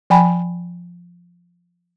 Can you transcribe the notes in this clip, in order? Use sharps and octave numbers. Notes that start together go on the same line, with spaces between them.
F3 G5 G#5 B5